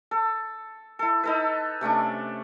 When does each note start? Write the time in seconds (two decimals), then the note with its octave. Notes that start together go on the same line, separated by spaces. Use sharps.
0.11 A4
0.99 E4 A4
1.23 D#4 A4 B4
1.81 C3 A3 C#4 D4